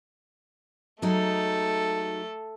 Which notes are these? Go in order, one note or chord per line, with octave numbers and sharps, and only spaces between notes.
F#3 G#3 A3 D#4 A4